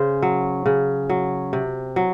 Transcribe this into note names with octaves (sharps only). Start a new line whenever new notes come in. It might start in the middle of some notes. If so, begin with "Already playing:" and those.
Already playing: C#3 C5
F#3
C#3
F#3
C3
F#3